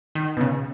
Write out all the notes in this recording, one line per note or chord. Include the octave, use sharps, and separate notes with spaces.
D#3
B2
C#3